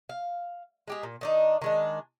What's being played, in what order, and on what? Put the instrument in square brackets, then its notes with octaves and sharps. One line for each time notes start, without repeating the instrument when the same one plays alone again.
[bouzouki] F5
G#3 G4 G#4
A#2
D#3 D4 D#4
D#3 G#3 D4